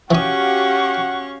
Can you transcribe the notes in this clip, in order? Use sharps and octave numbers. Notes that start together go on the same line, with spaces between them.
E3 C#4 F#4 G4 F5 F#5 C#6 D#6